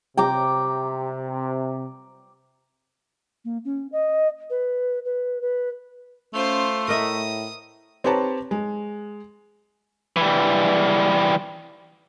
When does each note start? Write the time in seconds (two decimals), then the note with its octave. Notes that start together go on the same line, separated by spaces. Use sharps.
0.17 C3 G5 A#5 D6
3.45 A#3
3.65 C#4
3.92 D#5
4.50 B4
5.05 B4
5.42 B4
6.34 A3 C#4 F4 C5
6.88 A2 A#4 D#5 E5 D#6
8.04 C4 G4 B4 C#5 A5 A#5
8.51 G#3
10.17 E3 G3